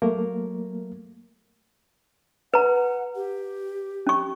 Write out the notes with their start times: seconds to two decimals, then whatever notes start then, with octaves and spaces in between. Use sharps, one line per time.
0.02 F#3 A3 A#3 A#4
2.54 B4 F#5 A#5
3.16 G4
4.07 C#4 C#6